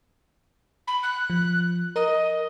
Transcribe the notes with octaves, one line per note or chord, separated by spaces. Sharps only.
B5
F#6
F3
A#4 D#5